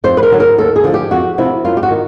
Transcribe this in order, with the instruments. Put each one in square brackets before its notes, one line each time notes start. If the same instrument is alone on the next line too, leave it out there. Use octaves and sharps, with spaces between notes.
[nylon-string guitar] F2 C5
B4
A#4
D3 F#3
A#4
D#2 A4
G#4
D3 F3
G4
F2 F#4
C3 F3 E4
F#2 F4
G4
F#4
D#3